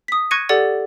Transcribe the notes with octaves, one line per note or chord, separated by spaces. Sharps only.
D#6 B6
C#6 F#6 G#6 A#6 C#7 D#7
G4 A4 D5 F#5 A6